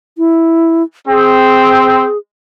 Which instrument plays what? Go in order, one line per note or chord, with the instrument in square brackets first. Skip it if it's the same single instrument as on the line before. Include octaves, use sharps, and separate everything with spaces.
[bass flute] E4
[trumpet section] C4 [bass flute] G#4